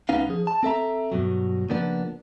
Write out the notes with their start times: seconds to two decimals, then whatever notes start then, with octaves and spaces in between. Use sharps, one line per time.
0.09 C#2 B3 C#4 D#4 F5
0.29 F3 G#4
0.47 A5
0.63 C4 A4 E5 A#5
1.12 G2 B2 F#3
1.69 C#3 F3 A#3 B3 D4